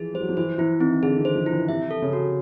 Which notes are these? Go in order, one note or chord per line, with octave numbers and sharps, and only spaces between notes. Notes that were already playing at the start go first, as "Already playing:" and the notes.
Already playing: E3 F3 G#4
G3 C5
F#3
F3
E3 C5
E3 E4
D#3 C4
D3 G#4
D#3
C5
F3
E4
E3
C3 E5
A4
C#3
F#4